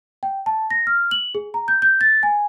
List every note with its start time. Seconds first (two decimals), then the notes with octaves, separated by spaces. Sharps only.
0.23 G5
0.46 A5
0.70 A#6
0.87 F6
1.11 F#7
1.35 G#4
1.54 A#5
1.68 G6
1.82 G6
2.01 A6
2.23 G#5